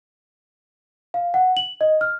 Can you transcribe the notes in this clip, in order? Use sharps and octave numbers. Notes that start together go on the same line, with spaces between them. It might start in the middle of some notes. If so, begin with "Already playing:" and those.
F5
F#5
F#7
D#5
F6